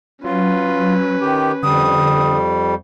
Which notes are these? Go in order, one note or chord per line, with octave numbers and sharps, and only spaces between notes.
F#3 C#4 F4 B4
D#3 G4
F2 D3 G3 D#6